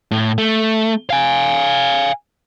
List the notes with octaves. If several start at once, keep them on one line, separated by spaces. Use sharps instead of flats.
A2
A3
F5 G#5